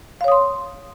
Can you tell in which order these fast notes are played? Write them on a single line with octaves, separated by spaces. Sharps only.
F5 C#5 D#6 C6